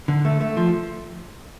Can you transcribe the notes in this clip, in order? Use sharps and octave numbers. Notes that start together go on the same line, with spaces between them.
D3
A3
A3
F3